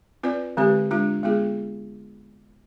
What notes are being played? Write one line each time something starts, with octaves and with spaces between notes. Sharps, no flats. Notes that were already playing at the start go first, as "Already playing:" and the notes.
C4 F4 B4 D5
D3 G#3 C4 G4 B4
G#3 D4 F4
G#3 B3 F4 G#4